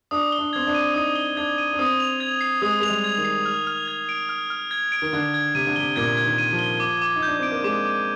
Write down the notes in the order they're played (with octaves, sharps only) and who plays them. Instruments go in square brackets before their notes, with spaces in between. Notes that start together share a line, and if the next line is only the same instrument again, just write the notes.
[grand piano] D4 [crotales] D#6
[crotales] G7
[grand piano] D4
[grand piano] C4 [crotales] G#6
[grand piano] D4
[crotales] D#7
[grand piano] D#4 [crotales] D#6
[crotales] G7
[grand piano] D4 [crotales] G#6
[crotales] D#7
[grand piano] D4
[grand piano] C4 [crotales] D#6
[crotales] F7
G#6
C7
[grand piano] G#3 [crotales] D#6
[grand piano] G#3 [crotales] F7
[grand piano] G3
[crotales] G#6
[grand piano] D#3
[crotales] C7
F6
F6
G#6
D7
F6
F6
G#6
D7
[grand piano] D#3
[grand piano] D3 [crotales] G#6
[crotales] G#6
[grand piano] C3 [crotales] D#7
[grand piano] D3
[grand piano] C3 [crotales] G7
[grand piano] A#2 [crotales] G#6
[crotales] G#6
[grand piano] D#3
[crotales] D#7
[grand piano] F3
[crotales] G7
D6
D6
[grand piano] D#4
[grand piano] D4 [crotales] G6
[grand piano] C4 [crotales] D7
[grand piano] A#3
[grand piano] G#3 [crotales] D6
[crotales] D6